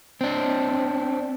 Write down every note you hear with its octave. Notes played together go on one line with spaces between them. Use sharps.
C4 D4